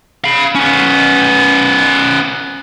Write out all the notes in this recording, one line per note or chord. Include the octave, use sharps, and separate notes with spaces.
F5 B5
B3 C#4